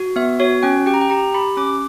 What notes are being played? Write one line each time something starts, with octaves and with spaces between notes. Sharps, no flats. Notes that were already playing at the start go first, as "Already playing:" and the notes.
Already playing: F#4
B3 E5
F#4 C#5
C#4 G5
G4 G5
A#5
G5
G4 A#5
G4 B5
C#4 D6